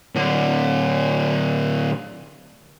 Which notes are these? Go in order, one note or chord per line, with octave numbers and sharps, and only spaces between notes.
A2 D3